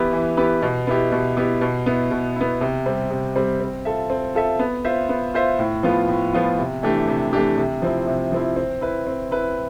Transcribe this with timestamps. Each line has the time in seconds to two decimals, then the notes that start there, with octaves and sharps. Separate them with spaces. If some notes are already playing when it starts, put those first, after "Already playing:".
Already playing: E3 B3 E4 G4 B4
0.13 E3
0.37 B3 E4 G4 B4
0.62 B2
0.87 B3 E4 G4
1.12 B2
1.37 B3 E4 G4
1.61 B2
1.86 B3 E4
2.11 B2
2.36 B3 E4
2.61 C3
2.86 G3 C4
3.11 C3
3.36 G3 C4
3.60 C4
3.85 F4 A4 E5
4.10 C4
4.35 F4 A4 E5
4.59 B3
4.85 F4 C5 E5
5.09 B3
5.34 F4 C5 E5
5.59 A2
5.83 F3 B3 F4
6.08 A2
6.33 F3 B3 F4
6.58 C3
6.83 E3 A3 D4 G4
7.08 C3
7.33 E3 A3 D4 G4
7.58 C3
7.82 F3 C4 E4
8.07 C3
8.32 F3 C4 E4
8.56 C4
8.81 E4 B4
9.07 C4
9.31 E4 B4